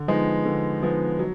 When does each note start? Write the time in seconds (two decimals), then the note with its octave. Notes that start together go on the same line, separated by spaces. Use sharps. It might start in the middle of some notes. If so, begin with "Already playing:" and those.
Already playing: D3
0.08 F3 G#3 B3 D#4
0.45 D3
0.82 F3 G#3 B3 D#4
1.19 F#3